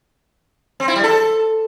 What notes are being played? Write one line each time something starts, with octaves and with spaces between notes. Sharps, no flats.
C4
E4
G3
A4